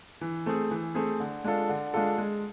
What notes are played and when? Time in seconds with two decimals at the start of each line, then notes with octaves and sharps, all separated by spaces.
0.21 E3
0.46 A3 C4 G#4
0.71 E3
0.95 A3 C4 G#4
1.20 D3
1.44 G#3 D4 F4 A4
1.69 D3
1.94 G#3 D4 F4 A4
2.18 G#3